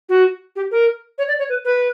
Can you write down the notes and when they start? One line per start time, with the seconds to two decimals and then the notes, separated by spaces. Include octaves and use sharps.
0.09 F#4
0.56 G4
0.71 A#4
1.18 C#5
1.28 D5
1.39 C#5
1.49 B4
1.65 B4